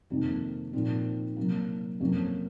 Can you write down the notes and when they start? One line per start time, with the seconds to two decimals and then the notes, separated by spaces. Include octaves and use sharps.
0.10 F2 C3 D#3 A#3
0.73 A#2 F3 C4 D#4
1.37 C3 F#3 A#3
2.00 F2 C3 F#3 A#3 C#4